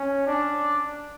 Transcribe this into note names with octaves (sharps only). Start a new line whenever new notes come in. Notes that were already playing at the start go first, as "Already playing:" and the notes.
Already playing: C#4
D4